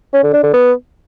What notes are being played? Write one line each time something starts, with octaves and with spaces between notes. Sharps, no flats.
C#4
D3
D4
D3
B3